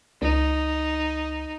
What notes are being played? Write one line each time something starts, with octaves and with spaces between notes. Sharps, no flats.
C#2 D#4